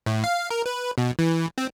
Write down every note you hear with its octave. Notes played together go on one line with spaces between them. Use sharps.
A2
F5
A#4
B4
B2
E3
C4